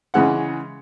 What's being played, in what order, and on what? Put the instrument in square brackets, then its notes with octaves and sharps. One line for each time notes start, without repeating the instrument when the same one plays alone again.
[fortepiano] C#3 E3 G#3 F#5